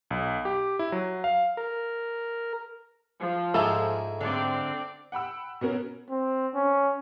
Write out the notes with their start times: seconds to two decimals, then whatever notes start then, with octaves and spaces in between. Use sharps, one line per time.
0.11 B1
0.45 G4
0.79 E4
0.92 F#3
1.24 F5
1.57 A#4
3.20 F3
3.54 G#2 E4 G#4 A4 A#5
4.21 D3 C4 D5
5.12 F#5 G5 B5 E6
5.61 B2 B3 C#4 F#4 A#4
6.09 C4
6.54 C#4